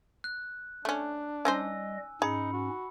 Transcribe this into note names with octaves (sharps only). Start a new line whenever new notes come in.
F#6
A3 C#4 D4
G3 C#4 D#4 C5 D#5 G#5 E6
G#2 C#4 D#4 G#4 A#5 B5 C#7
F#4